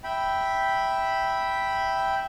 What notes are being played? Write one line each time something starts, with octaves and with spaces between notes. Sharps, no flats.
E5 G5 B5